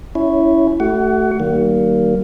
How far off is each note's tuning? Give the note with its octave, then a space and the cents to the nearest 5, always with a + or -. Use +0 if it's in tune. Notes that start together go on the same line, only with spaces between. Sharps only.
C#4 +25 E4 +0 C#5 +0
A3 +0 F#4 +40 F#5 +20
D#3 +0 G3 -40 A#3 +0